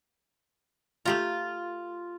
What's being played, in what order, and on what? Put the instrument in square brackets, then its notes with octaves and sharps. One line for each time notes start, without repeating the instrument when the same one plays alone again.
[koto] A3 G4 A#5 [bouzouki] F4